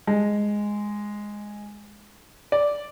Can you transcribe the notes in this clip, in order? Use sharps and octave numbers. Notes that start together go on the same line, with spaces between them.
G#3
D5